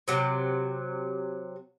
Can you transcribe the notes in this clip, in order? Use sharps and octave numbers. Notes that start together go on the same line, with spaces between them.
C3 F#3